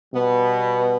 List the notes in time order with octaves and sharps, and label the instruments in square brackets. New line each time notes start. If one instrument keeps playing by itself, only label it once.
[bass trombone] B2 [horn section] G3 B3